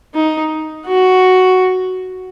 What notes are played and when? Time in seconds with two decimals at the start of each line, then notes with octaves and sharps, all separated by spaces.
0.14 D#4
0.86 F#4